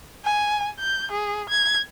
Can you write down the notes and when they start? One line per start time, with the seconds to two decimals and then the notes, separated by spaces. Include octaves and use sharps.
0.25 G#5
0.80 G6
1.12 G#4
1.50 G#6